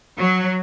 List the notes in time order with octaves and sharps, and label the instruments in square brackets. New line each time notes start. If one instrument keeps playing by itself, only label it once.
[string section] F#3